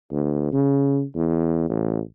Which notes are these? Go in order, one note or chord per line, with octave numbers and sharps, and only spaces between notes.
D2
C#3
E2
A1